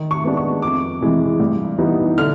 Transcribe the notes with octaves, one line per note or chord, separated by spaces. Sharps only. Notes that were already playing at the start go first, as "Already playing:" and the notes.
Already playing: D#3
C#6
G#3 B3 D4
C#6
F2 D6
C3 E3 G#3
G2
E3 G3 B3 D#4
D3 F6